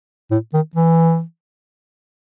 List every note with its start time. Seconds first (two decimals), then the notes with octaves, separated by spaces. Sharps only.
0.31 A2
0.53 D#3
0.75 E3